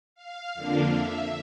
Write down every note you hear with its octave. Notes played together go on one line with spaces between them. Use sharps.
F5
F2 D3 F3 A#3 D4
E5